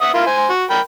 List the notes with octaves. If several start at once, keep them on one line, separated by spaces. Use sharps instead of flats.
E5 F#5 D#6
E4 F4 A#4
C5 G#5
F#4
A#4 G5 B5